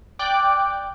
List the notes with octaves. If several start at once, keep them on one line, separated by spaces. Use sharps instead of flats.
D5 G5 D6 F#6